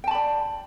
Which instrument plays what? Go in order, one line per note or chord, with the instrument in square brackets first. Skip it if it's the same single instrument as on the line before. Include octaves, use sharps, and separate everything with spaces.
[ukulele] G5
A5
B5
D5